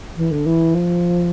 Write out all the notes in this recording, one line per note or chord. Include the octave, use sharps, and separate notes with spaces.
E3
D3
E3
F3